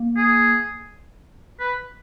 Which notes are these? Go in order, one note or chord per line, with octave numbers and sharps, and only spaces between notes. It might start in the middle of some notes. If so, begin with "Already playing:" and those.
Already playing: A#3
G#4
B4